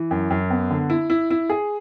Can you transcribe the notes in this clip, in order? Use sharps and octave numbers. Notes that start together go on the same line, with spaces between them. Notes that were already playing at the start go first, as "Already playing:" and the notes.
Already playing: E3
F#2
F#2
B3
D3
E4
E4
E4
G#4